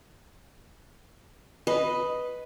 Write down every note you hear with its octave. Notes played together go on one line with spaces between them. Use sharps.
B4 D#5